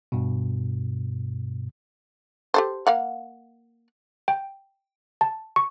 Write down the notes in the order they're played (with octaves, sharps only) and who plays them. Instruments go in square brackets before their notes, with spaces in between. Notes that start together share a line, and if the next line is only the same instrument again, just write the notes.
[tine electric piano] G2 B2
[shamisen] G4 A4 C5
A#3 F5 F#5
[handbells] G5
A5
C#6